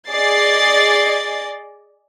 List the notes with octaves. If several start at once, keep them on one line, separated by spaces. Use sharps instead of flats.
G#4 D5 D#5 A6 C7